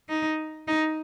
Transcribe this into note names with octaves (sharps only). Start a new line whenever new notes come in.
D#4
D#4